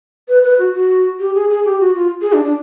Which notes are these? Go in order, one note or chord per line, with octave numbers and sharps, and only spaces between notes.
B4
B4
F#4
F#4
G4
G#4
G#4
G4
F#4
F4
G#4
D4
D4